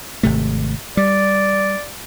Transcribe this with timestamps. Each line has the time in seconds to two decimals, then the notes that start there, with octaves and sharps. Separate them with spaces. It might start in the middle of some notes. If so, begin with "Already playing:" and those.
0.23 G#1 C3 A3
0.97 G3 D5